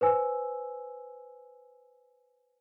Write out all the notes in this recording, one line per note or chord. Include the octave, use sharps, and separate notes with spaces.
B4 C5 G#5 E6